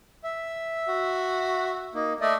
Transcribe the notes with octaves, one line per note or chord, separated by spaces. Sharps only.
E5
F#4
A#3 D#4
A3 D5 D#5